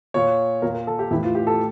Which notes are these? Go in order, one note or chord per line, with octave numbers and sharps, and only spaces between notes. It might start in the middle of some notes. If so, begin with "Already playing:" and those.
A#2 C#5
A#2 A#4
A#4
A4
G4
A2 E3 E4
F4
G4
A4